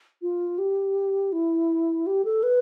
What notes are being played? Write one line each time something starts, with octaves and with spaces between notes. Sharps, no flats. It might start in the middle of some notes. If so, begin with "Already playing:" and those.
F4
G4
E4
G4
A4
B4